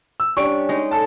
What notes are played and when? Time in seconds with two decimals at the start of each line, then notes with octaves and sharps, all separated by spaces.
0.20 E6
0.37 G3 C#4 D4 C#6 D7
0.69 G#3 D#4
0.91 A4 A5